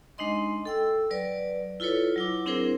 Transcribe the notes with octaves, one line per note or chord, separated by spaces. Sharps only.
G#3 D4 D#4 D#5 C6
A4 G5 E6
F#3 B4 D5
E4 F4 A4 B4 C#5
F#3 E4 D6
C4 D4 E4 G#4 A#4 C5